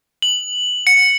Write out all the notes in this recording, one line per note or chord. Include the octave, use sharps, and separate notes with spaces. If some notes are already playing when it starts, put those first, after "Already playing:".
F#7
C#7